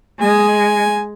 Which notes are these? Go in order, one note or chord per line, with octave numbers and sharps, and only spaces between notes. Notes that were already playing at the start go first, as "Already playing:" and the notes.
G#3 G#5